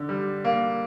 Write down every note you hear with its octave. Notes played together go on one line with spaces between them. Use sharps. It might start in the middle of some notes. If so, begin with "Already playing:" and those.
Already playing: D3
G3
A#3